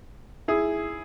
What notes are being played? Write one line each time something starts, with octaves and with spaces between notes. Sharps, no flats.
E4 G#4